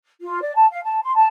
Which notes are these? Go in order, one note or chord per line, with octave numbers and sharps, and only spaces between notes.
F4
D5
A5
F5
A5
C6
A5